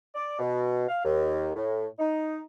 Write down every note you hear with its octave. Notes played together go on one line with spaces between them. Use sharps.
D5
B2
F5
D#2
A2
D#4